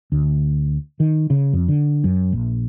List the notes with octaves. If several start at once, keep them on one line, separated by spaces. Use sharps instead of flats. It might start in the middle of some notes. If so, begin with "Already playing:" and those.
D2
D#3
C#3
F2
D3
F#2
A#1